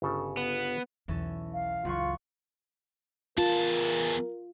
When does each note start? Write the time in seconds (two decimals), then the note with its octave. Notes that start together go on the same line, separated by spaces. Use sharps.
0.02 G1 C#3 A4
0.37 B3
1.08 B1 E2 E3 C#4 A4
1.53 F5
1.85 F#1 C#2 F4 F#5 C#6
3.38 E2 F4 A#4 A5